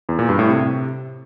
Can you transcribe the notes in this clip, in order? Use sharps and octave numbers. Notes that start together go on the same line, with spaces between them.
E2
A#2
G2
A2
C3